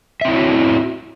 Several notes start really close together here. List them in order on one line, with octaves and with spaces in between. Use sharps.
E5 C4 E4 C#5 F#4